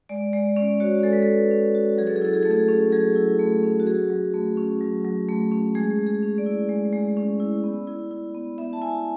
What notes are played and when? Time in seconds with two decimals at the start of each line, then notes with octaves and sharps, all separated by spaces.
0.09 G#3 D5
0.33 G#3 D5
0.56 C#4 D5
0.80 F#4 C#5
1.03 G#3 A4
1.13 B4
1.23 A4
1.28 G#3
1.51 C#4
1.75 F#4
1.98 F#3 G#4
2.07 A4
2.16 G#4
2.22 E4 A4
2.33 G#4
2.43 A3 A4
2.51 G#4
2.68 C#4
2.92 F#3 G#4
3.16 E4
3.39 A3
3.63 C#4
3.80 F#4
3.87 F#3 G#4
4.10 F#3
4.34 A3
4.57 C#4
4.81 F#3
5.05 F#3
5.28 A3
5.52 C#4
5.75 G#3 G#4
5.99 G#3
6.06 G#4
6.23 C#4
6.38 D5
6.46 E4
6.69 G#3
6.93 G#3
7.17 C#4
7.40 E4
7.64 B3
7.87 E4
8.11 E4
8.35 B3
8.58 B3 E5
8.73 A5
8.82 E4 G#5